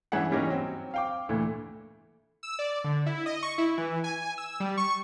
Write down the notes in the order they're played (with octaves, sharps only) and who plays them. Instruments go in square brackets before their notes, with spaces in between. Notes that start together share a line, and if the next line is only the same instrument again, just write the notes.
[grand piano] G2 E3 C#4 G#4 E5 F#5
E3 G3 A#3 C#4 D#4
F#3 C4
F5 G5 D6
D2 A#2 E3 A3
[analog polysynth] E6
D5
D3
E4
D#5
C#6
E4
E3
G#5
E6
G3
C#6